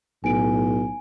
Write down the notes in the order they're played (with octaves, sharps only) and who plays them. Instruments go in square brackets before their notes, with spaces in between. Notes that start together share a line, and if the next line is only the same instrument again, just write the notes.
[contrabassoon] B1 [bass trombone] A2 [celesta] G#5 D7